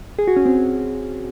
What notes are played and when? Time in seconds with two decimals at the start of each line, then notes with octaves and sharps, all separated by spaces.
0.19 G#4
0.28 F#4
0.37 C#4
0.46 C4